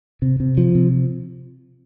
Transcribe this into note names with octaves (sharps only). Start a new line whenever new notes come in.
C3
C3
F3
C3